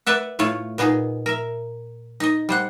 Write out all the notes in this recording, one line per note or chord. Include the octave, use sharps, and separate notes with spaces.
B4 D5 E5 F#5
A2 A3 F4 C#5
A#2 B3 D#4 G#4
A#4 E5
D#4 D#5
G3 C5 F#5